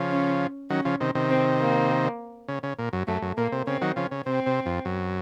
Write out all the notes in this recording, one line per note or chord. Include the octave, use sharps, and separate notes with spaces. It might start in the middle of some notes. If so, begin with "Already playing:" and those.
Already playing: C#3 F3
C#4
D#3 F#3 C#4
C#3 F3
C3 D#3
C3 D#3
C4
A#3
C#3
C#3
A#2
F#2
F#2 A3
F#2
A#2 A#3
C3
C#3 C4
D#3 F#3
C#3 F3
C#3
C3 C4
C3
F2
F#2